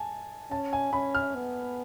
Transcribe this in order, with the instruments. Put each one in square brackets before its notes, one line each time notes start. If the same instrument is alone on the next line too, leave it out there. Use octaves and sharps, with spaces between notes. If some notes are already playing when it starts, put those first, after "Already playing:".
Already playing: [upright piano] G#5 A5
[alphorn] C#4 [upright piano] A5
[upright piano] G#5
[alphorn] C#4 [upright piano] B5
[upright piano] F6
[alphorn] B3